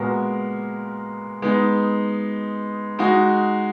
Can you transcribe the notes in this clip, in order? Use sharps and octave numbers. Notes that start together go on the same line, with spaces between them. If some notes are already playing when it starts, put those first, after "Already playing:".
Already playing: A#2 G#3 B3 F#4 A#4
G#3 B3 D#4
G#3 D#4 F#4